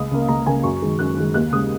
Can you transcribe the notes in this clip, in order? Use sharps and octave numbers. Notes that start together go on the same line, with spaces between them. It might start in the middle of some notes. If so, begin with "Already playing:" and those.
Already playing: C#2 D#6
C#3 A#3
C#2 A#5
C#3 A#3 G#5
F#2 C#6
D#3 G#3
F#2 F#6
D#3 G#3
D#2 F#6
C#3 G#3 D#6